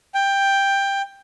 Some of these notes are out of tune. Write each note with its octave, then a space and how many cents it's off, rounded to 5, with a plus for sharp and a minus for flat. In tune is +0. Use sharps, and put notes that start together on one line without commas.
G5 +10